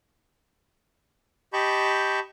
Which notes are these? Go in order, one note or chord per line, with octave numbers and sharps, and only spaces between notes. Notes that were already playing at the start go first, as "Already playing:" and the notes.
G4 D#5 A5 B5 C#6 G6